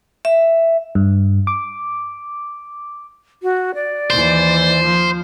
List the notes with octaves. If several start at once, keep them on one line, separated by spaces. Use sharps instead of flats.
E5
G2
D6
F#4
D5
D#2 E3 C5
F3